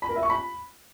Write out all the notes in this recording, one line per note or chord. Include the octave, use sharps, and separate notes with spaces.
B5
A#4
E5
C#6
B5